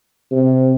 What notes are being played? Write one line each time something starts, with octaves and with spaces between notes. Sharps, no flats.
C3